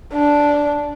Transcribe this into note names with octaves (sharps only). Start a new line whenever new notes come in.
D4